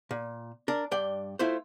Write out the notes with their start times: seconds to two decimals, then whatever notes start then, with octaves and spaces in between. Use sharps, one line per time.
0.11 A#2
0.68 D4 A#4
0.91 G2 D5 G5
1.39 A3 E4 F4 C5